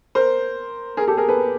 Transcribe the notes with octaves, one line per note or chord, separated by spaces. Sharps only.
A#4 C5
G#4 A#4
G4 A4
G#4 A#4
A4 B4